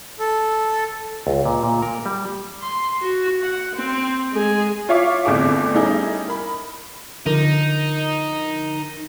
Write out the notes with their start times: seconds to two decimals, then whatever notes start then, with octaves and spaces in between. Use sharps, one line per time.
0.19 A4
1.27 C#2
1.45 A#2
1.64 A#2
1.82 A#4
2.06 G3
2.62 C6
3.01 F#4
3.43 F#5
3.75 C4
4.32 G#3 G#4
4.88 E4 F4 C#5 E5 F5 D6
5.25 G1 F2 A2 E4 G#4 D6
5.74 G3 A3 C#4 D#4 E4 G#4
6.28 A#4 B5
7.26 D3 F3 D#4 A#4